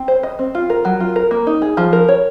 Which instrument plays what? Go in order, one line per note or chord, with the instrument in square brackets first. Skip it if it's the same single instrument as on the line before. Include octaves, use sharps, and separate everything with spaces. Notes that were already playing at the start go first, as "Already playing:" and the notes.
Already playing: [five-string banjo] C4
C5
D#5
C4
F4
A#4
F#3
F4
A#4
A#3
D#4
G#4
F3
A#4
C#5